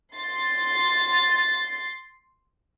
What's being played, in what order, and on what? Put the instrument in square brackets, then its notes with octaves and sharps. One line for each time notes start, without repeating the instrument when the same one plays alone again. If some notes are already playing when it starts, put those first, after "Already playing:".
[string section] C6 A6